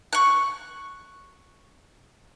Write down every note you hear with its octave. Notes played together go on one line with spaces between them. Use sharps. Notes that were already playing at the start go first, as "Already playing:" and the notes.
C#6 F#6